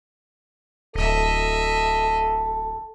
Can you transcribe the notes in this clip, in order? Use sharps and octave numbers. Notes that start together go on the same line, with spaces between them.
D1 A4 D#5 E5